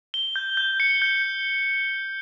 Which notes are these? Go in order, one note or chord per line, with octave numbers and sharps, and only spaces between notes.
G7
G6
G6
C#7
G6